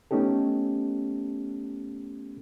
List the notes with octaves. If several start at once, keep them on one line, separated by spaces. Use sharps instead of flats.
A3 B3 C#4 D#4 G4 A4